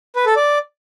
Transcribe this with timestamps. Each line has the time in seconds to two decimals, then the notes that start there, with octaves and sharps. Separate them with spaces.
0.16 B4
0.26 A4
0.36 D5